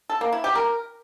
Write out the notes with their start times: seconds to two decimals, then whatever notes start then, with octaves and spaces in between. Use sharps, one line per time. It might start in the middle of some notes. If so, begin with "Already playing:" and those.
0.10 A4
0.21 A#3
0.32 E4
0.44 G4
0.55 A#4